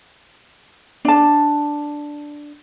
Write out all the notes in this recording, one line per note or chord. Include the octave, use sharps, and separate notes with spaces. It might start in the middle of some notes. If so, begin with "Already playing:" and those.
D4 A5